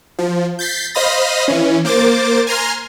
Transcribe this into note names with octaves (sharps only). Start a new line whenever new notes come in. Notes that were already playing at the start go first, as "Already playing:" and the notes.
F3
G6 A6 B6 C7
C5 D#5 F5 B5 D#6 A#6
E3 C#4
A#3 C5 D6 A6
G#5 A#5 C6 F6